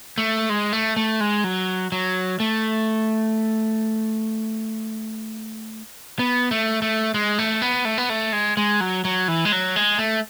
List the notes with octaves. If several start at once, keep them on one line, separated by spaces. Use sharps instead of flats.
A3
G#3
A3
A3
G#3
F#3
F#3
A3
B3
A3
A3
G#3
A3
B3
A3
B3
A3
G#3
G#3
F#3
F#3
E3
G#3
F#3
G#3
A3